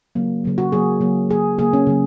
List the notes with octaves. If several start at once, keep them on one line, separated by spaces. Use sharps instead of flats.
C#3 F#3 A#3
C#3 F#3 A#3
F#4
C#3 F#3 A#3 G#4
C#3 F#3 A#3
C#3 F#3 A#3 G#4
C#3 F#3 A#3 G#4
C#4
C#3 F#3 A#3